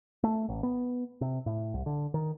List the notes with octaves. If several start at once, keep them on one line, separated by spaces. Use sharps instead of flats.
A3
A1
B3
C3
A2
C2
D3
D#3